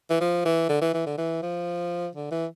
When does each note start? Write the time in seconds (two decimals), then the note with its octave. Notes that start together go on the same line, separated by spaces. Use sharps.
0.10 E3
0.21 F3
0.45 E3
0.69 D3
0.81 E3
0.94 E3
1.06 D3
1.18 E3
1.42 F3
2.15 D3
2.31 E3